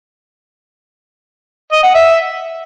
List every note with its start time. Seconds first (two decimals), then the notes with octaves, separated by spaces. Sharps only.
1.72 D#5
1.83 F#5
1.95 E5